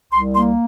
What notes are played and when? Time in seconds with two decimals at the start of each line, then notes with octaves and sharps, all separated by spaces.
0.13 C2 C6
0.36 A#3 C6